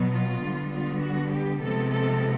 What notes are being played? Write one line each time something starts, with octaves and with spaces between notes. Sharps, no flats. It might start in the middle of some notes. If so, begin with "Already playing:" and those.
Already playing: B2 F#3 B3
F4
D3 G3 B3
F4
F#4
G4
C3 F3 G#3 B3 A4
A4